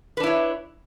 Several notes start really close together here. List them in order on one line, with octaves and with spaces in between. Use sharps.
B4 D4 E4 C#5